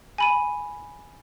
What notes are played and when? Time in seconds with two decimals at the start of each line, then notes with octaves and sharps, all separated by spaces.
0.18 G#5 B5 D#7